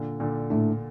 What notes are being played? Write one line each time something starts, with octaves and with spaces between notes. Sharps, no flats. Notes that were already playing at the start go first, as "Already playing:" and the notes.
Already playing: A#2 D3
A#2 D3
A2 A3 D4